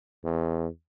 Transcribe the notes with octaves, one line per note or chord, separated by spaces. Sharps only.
E2